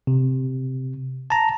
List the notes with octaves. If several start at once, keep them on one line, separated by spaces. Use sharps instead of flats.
C3
A5 A#5